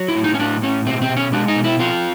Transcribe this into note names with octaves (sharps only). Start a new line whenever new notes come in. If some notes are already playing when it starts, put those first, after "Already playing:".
Already playing: F#3
E4
A2
D#4
C#4
A2 D4
A2 C#4
B2 C4
C4
B2
C#4
G#3 D4
D#4
B2
E4
C4 F4